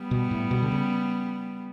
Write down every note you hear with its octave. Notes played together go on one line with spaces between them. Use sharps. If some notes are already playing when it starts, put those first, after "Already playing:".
Already playing: G3 B3
B2
A2
B2
D3
C#3